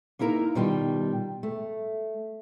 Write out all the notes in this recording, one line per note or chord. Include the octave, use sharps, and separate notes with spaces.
A#3 D#4 E4 A#4 A#5
B2 D#3 G3 F4 G5
A3